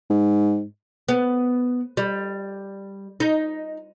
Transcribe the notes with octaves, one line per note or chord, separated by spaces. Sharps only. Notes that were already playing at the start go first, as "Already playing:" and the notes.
G#2
B3
G3
D#4